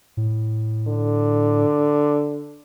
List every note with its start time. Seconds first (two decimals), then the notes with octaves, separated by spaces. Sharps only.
0.17 A2
0.87 D3